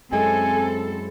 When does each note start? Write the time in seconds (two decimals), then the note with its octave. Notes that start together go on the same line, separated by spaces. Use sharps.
0.13 F#2 G#3 C4 E4 A4 G#5